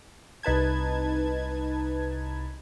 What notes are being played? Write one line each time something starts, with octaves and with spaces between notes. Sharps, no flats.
C2 D#4 B4 A5 G#6